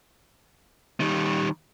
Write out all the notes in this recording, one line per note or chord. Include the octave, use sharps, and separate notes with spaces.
D#3 G3